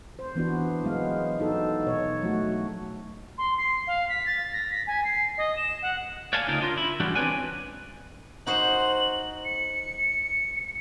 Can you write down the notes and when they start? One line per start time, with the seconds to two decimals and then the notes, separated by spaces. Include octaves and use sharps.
0.19 C5
0.36 E3 B3 D4 F#4
0.84 F#3 G#3 B3 F5
1.40 D#4 F#4 A4
1.87 B2 C#5
2.23 F#3 A3 F#4
3.38 C6
3.57 C7
3.87 F5
4.09 B6
4.26 A6
4.53 A#6
4.71 B6
4.87 G#5
5.04 C7
5.38 D#5
5.56 E7
5.82 F#5
6.33 C#5 D5 F5 G#5 A5
6.48 D2 C#3 D#4 F4 A#4 D#5
6.61 D4 F4 A#4
6.77 E4
7.00 E3 G3 G#3 C#4 D4 F#4
7.15 C4 B4 C#5 D5 G#5
8.47 D#4 F#4 C5 F#7
9.45 C#7